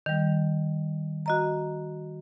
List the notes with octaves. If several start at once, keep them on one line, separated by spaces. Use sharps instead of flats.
D#3 G3
F#4 D#5 A#5